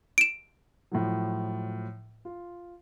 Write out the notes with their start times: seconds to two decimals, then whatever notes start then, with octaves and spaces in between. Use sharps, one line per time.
0.18 D7 E7
0.92 A2 F3 F#3
2.25 F4